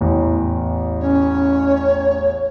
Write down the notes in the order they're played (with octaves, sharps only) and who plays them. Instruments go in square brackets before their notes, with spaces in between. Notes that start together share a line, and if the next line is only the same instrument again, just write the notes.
[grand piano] A1 E2
[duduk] C#4 [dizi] C#5